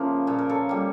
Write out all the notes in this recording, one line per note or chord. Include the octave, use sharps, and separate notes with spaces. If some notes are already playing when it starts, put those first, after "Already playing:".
Already playing: C#3 F3 A#3 C#4 E4
A#2 C#5
A#4
A4 C#5
G3 A#3